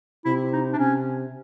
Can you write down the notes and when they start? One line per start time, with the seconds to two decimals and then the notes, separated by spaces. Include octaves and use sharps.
0.25 C3 E4
0.53 D#4
0.73 D4
0.78 C3 C#4